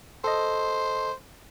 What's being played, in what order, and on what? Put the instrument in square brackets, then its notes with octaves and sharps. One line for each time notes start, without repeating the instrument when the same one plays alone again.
[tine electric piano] A4 D#5 [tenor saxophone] C5